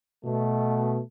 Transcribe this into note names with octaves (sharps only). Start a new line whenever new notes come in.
B2 A3